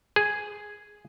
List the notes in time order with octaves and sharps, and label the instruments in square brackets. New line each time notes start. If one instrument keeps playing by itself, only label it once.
[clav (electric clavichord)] G#4